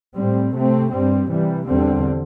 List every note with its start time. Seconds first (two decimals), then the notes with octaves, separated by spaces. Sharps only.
0.16 A2 G3 C4
0.54 C3 A3 C4
0.91 G2 G3 C4
1.29 C3 E3 G3
1.66 E2 D3 G3 C4